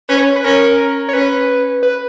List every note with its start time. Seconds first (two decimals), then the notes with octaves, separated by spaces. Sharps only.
0.09 C#4 B4
0.17 C#5
0.36 B4
0.44 C#4 A#4
1.09 C#5
1.13 C#4 B4
1.83 B4